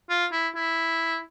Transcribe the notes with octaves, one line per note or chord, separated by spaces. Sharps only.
F4
E4
E4